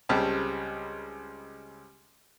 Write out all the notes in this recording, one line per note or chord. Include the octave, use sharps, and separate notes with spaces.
C#2 C#3 G3 C4 A5